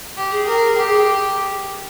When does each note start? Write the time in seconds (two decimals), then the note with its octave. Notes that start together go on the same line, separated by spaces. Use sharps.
0.17 G4
0.32 G#4
0.46 A#4
0.76 G4